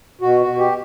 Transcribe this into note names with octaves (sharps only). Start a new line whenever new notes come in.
B2 F#4
F#4
B2
G4